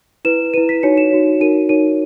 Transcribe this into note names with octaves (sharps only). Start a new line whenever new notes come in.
E4 B4 E7
E4 B4 D#7
B6
D#4 F#4 C#5 C#7
E7
D#4 F#4 C#5
D#4 F#4 A#4 C#5 D#7
D#4 F#4 A#4 C#5 D#7